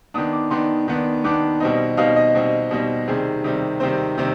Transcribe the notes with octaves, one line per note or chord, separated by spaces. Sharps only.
D#3 B3 D4 D#6
D6
D#3 B3 D4 C6
D#3 B3 D4
D#3 B3 D4 D6
B2 G3 C4 D#4
B2 G3 C4 D#4 F5
D#5
B2 G3 C4 D#4
B2 G3 C4 D#4
C3 D#3 G3 C4 G#4
C3 D#3 G3 C4
C3 D#3 G3 C4 C5
C3 D#3 G3 C4